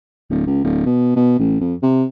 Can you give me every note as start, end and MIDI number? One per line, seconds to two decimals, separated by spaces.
0.30 0.45 26
0.47 0.62 37
0.64 0.82 26
0.86 1.15 47
1.16 1.35 47
1.39 1.56 33
1.60 1.74 41
1.82 2.04 48